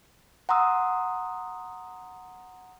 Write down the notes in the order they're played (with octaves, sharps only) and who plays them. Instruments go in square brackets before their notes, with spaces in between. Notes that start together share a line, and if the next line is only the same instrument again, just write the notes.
[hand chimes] F#5 A#5 C6 D#6 E6